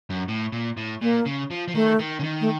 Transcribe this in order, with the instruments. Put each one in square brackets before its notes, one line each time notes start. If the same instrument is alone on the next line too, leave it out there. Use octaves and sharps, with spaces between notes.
[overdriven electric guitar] F#2
A2
A#2
A2
[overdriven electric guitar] A#2 [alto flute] A#3
[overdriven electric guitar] C#3
F3
F3
[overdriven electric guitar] D#3 [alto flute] A3
[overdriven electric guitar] D#3
C#3
D#3
[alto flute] A3